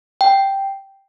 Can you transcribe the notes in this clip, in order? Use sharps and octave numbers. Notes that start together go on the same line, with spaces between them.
G5